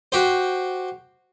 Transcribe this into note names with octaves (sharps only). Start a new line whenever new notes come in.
F#4 G4 C5